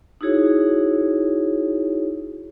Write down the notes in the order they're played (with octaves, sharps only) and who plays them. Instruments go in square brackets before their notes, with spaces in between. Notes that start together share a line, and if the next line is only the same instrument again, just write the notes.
[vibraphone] D#4 E4 F#4 G#4 C#5